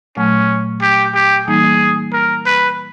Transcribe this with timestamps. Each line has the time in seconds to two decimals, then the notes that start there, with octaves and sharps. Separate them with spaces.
0.16 A#2 F#3 A3 C#4
0.82 G4
1.15 G4
1.48 E3 G3 A#3 D#4 G#4
2.13 A#4
2.46 B4